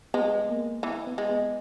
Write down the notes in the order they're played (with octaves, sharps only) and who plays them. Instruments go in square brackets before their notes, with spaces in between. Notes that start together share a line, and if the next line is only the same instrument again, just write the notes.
[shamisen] G#3 [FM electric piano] B3
[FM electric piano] A#3
[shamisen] E3 [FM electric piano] B3
[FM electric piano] B3
[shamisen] G#3
[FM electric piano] B3